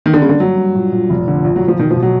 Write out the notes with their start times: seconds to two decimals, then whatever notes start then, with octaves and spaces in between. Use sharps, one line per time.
0.06 D#3 A#3
0.14 D3
0.22 C#3 G3
0.29 D3
0.40 G2 F#3
0.57 G2
0.75 A#2
0.92 A#2
1.10 F1
1.28 D3
1.44 A#1
1.56 F#3
1.62 A#1
1.68 F3
1.79 B2 D#3
1.91 F3
1.96 B2
2.03 F#3